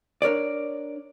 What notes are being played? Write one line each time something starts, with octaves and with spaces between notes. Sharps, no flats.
D4 A#4 C#5 D5